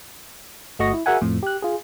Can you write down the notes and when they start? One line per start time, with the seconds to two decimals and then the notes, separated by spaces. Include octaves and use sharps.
0.79 G1 A3 F#4 D#5 C#6 A#6
0.93 E4
1.06 F#4 G#4 A#4 E5 F#5 G#5
1.21 F2 A2 F3
1.43 G4 F#6
1.62 F4 G#4